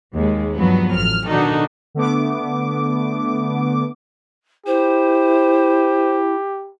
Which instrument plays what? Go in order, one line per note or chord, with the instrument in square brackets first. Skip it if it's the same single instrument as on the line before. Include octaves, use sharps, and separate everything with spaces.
[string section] D#2 G#3
G2 F3 F#3 B3
A1 F6
B2 D#3 D4 D#4 F#4 A4
[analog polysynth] D3 A3 B3 D6
[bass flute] E4 [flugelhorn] G4 [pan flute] C5